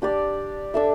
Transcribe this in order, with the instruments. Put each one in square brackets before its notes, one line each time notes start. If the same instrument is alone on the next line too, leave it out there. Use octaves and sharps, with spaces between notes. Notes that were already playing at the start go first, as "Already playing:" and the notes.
[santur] D4 G4 D5
D4 A4 E5